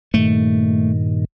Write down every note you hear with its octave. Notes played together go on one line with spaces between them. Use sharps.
G2 A#2 D#3 A3